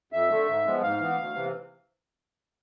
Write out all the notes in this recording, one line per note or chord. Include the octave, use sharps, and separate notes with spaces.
F2 E5
D3 A3
G#2
F3 G#3 B3
G#2 F5
E3 B3
D2
C3 E3